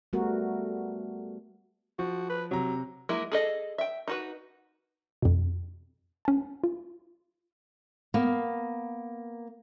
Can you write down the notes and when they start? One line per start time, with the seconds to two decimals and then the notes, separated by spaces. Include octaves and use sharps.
0.13 G3 A3 B3 F#4 A#4
1.99 F3 F#4
2.30 B4
2.51 C3 F#3 A#5
3.09 F#3 G#3 A#3 E4
3.32 G#4 A4 D#5
3.78 E5 G5
4.08 D#4 F#4 B4
5.22 F2 B2
6.25 C#4 A5
6.64 F4
8.14 A#3 B3 F5